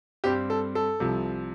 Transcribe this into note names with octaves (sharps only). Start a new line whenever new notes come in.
G2 G3 C4 G4
A4
A4
C2 C3 F3